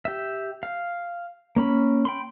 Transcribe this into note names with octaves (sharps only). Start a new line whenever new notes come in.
G4 E5
F5
A#3 C#4 B5
G5 B5 C6